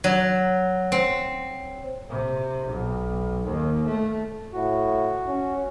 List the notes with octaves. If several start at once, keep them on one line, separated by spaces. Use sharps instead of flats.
F#3
C4
C3
B1
D#2
A3
A2 F#4
C#4